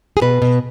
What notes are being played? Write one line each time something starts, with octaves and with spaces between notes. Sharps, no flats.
G#4
B2 B4
B2